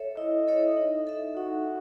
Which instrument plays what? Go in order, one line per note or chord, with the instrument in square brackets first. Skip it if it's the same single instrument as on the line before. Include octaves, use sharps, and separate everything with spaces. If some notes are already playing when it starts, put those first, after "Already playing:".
Already playing: [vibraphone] A4 C#5 E5
[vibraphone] E4 [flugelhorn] D#5
[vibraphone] A4 C#5 E5
D#4
A4 E5
[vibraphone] D#4 [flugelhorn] F#4